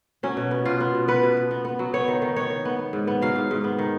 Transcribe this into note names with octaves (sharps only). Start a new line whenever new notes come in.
F#3 C#4
B2
B3
B2 F4
B3
B2
B3 B4
B2
B2
B3
B3
F#3
B3 C#5
D#3
D#3
B3 C#5
D#3
B3
B3
G#2
B3
F#3 F5
G#2
G#2
B3
D#3